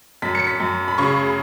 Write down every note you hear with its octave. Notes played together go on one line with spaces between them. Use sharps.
F#2 B6
C#7
B6
F#2
B5
C#3 C#6